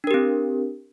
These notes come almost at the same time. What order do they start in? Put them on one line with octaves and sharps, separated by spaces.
D4 A#4 G4 C4